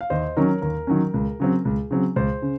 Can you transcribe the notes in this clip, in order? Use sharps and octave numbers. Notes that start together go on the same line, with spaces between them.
F5
D#2 C5 D#5
D#3 F#3 C#4 A#4 C#5
D#2 A#4
D#3 F#3 C#4
C#2
C#3 F#3 C4
C#2
C#3 F#3 C4
C#2 C5
C#3